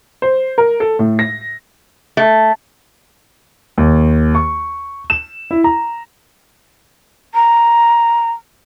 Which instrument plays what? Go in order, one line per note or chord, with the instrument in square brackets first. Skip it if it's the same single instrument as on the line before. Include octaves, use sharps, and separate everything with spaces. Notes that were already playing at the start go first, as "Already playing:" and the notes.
[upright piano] C5
A#4
A4
A2
A#6
[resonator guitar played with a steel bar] A3
[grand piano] D#2
C#6
E7
E4
A#5
[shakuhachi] A#5